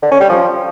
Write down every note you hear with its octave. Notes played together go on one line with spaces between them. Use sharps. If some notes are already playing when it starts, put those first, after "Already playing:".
D3
C#4
G3
F3